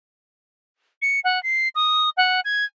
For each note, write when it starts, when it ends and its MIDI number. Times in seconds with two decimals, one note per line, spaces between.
1.02 1.20 97
1.24 1.42 78
1.43 1.68 96
1.75 2.10 87
2.17 2.40 78
2.45 2.64 92